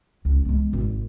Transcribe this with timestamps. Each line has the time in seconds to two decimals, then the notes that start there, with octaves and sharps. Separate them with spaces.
0.25 C#2
0.45 G#3 B3
0.73 G#1